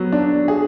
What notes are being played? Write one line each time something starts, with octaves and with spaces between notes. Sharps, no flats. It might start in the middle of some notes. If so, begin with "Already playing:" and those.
Already playing: F#3 B3
D4
G#4